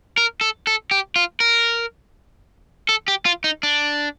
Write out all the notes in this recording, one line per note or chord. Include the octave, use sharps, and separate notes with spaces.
A#4
A4
A4
G4
F4
A#4
A4
G4
F4
D#4
D4